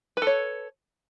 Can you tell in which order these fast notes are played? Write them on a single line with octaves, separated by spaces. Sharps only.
B4 A4 C#5